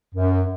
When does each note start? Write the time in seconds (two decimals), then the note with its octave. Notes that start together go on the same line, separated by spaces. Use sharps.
0.15 F#2